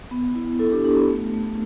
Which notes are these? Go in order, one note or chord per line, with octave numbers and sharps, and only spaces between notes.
B3
E4
E4 A4
D4 G4
D4 G4
B3
A3
A3